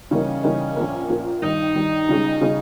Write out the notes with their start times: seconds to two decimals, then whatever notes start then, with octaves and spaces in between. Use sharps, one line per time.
0.11 C#3 E3 G3 A#3 C#4 D#4
0.44 C#3 E3 G3 A#3 D#4
0.77 A#1 A#2 A#3
1.09 A#1 A#2 A#3
1.42 G2 D#3 G3 D#4
1.75 G2 D#3 G3
2.08 C#2 C#3 G3 C#4 G#4
2.41 C#3 G3 C#4 G#4